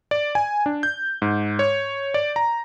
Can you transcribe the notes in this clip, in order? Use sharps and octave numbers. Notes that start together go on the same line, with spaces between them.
D5
G#5
D4
G6
G#2
C#5
D5
A#5